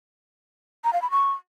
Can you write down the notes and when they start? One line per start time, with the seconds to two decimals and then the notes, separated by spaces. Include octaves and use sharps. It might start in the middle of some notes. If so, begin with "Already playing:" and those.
0.84 A#5
0.93 F5
1.02 B5
1.11 C#6